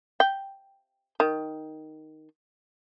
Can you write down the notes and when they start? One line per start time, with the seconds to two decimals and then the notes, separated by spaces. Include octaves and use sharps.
0.20 G5
1.20 D#3